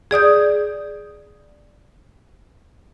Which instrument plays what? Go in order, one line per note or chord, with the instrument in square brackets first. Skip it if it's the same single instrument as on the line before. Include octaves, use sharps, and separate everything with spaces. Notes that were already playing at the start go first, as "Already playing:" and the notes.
[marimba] G#4 D5 D#6 G6